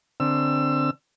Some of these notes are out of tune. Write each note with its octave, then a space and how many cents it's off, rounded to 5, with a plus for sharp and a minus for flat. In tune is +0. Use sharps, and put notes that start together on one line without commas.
D3 +0 C4 +0 E6 +25